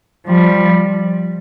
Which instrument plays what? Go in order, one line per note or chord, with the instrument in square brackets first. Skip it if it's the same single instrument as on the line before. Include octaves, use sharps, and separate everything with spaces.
[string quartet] F3 G3